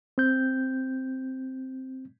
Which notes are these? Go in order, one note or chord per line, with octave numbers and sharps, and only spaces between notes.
C4 G6